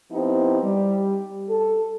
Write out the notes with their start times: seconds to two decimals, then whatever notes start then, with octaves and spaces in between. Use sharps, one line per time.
0.12 F3 B3 C4 D#4 E4 G4
0.63 G3
1.49 A4